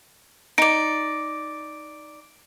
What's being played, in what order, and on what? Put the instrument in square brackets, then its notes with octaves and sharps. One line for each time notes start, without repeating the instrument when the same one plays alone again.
[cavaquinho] D#4 D5 [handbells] D7